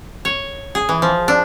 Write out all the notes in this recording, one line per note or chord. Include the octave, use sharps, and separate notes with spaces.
C#5
G#4
E3
F3
D4